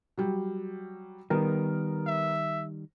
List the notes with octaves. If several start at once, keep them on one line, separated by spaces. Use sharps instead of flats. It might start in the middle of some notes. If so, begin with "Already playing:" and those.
F#3 G3
D#3 G3 B3 A#4
E5